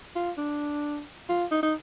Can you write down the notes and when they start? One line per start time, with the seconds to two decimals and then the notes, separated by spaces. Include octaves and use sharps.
0.15 F4
0.38 D4
1.29 F4
1.51 D#4
1.63 D#4